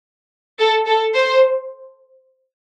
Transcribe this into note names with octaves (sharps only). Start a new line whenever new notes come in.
A4
A4
C5